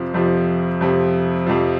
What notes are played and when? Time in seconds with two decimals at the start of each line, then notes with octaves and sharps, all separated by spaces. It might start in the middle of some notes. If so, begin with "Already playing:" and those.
Already playing: F2 C3 F3
0.14 F2 C3 F3
0.81 F2 C3 F3
1.46 F2 C3 F3